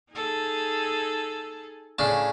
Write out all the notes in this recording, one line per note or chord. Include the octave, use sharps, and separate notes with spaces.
D#4 G#4 A4
A2 C#3 D4